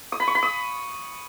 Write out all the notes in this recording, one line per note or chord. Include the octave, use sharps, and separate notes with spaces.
D#6
B5
C#6
B5
D#6